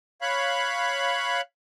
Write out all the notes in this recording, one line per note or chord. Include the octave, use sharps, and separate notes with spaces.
C#5 F5 B5 F#6